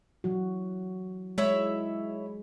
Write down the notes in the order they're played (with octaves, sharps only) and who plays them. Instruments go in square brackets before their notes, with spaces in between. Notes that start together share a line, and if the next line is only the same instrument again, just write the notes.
[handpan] E3 F#3 F#4
[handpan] G#3 [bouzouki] E4 C#5 E5